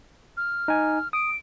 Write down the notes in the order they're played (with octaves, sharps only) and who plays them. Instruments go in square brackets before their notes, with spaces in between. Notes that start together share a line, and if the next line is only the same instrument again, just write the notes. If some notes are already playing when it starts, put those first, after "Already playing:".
[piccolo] F6
[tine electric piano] D#4 G#5
[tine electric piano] D#6 [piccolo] D7